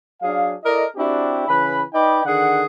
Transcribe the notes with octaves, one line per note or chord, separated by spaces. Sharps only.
F#3 D4 G#4 F5
E4 A4 A#4 D5 D#5
C4 D4 E4 F#4 G4
C#3 E3 B4 G#5 B5
D#4 B4 D5 D#5 G5 B5
D3 D#3 G#4 F#5